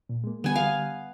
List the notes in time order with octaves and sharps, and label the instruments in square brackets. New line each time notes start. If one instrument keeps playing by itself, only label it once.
[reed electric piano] A#2
G#3 A#3
[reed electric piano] D3 G3 [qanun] B3 G#5
[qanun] F5